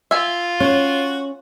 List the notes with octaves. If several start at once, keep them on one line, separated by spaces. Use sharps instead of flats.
F4 E5 G#5
C#4 F#4